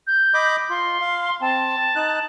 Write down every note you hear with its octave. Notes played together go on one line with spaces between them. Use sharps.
G6
D#5 B5 D6
F4 C6
F5
C4 A5
D#4 F#6